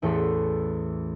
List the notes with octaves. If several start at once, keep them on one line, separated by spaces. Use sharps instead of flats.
A1 E2 A3 A4 C6 B6